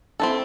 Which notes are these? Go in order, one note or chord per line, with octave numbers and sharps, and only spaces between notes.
C4 E4 A4